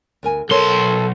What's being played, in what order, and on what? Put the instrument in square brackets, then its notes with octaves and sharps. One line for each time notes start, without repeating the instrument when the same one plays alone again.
[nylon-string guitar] D2 A#4 G#5
[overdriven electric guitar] B1 C6 [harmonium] A4 [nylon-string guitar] A#4 C#5